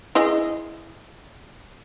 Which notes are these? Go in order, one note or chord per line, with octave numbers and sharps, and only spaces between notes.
E4 G#4 D#5